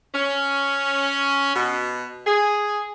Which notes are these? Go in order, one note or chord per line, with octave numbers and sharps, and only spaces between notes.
C#4
B2
G#4